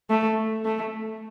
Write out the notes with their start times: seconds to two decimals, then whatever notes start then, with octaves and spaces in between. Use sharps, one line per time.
0.10 A3
0.65 A3